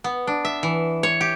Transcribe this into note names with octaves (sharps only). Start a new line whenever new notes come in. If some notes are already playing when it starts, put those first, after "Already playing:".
B3
D4
E5
E3
C#5
G4